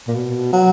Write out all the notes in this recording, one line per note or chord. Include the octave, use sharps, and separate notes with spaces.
A#2
B2
F#3